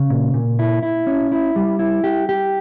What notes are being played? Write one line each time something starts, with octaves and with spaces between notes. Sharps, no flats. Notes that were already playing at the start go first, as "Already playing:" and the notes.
Already playing: C#3
A#2
A#2
E4
E4
C#4
E4
G3
E4
G4
G4